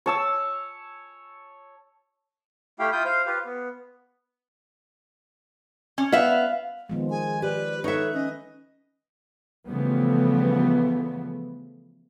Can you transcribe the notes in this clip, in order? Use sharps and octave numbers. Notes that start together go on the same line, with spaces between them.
C#5 A5 E6
A3 E4 G4 F5 G5
E4 F4 G5 D#6 G6
C5 F5
F4 G4 B4 F5
B3
C#4
B3 E5 F5
D#3 F3 G#3 B3
G#4 G#5
G4 B4 D5
D#4 A4 B4 C#5 E5
C#4 D#5
C#3 E3 F3 G3 A3 B3